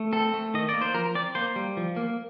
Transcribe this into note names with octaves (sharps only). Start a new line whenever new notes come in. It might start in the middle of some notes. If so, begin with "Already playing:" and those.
Already playing: A3
C4 A4
A3
D#3 D#5
A#3 D5
C5
F3 A#4
C4 D5
A#3 C5
G3
F3
A#3